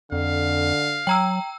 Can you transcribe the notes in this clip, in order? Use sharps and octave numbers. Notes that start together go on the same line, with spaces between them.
F2 D3 F5
F#3 G5 A#5 E6